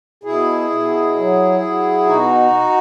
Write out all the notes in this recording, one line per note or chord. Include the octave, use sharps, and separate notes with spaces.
B2 E4 G#4
B2
F#3
F#3
B2 D#4 F#4